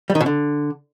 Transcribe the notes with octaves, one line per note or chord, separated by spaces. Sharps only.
G3
D#3
B2
D3